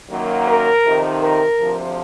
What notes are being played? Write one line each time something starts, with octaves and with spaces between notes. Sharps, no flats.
F#2 D#3 F#3 A#3
A#4
F2 C3 D#3
A#4
D2 C3 F3